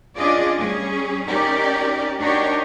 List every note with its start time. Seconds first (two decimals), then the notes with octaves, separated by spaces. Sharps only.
0.16 C#4 D4 F4 G#4 D5 D#5
0.56 G3 C#4 G#4
1.27 C#4 D#4 G4 A#4 D5
2.19 D4 D#4 F#4 G4 A#4 C#5